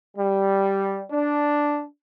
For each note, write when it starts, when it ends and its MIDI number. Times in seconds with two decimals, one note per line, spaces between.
0.17 1.04 55
1.10 1.84 62